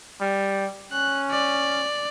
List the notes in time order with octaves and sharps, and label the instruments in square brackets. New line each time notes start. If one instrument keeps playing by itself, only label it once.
[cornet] G3
[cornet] C#4 [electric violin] F#6
[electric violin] D5